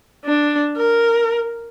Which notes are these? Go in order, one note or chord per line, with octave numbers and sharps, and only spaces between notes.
D4
A#4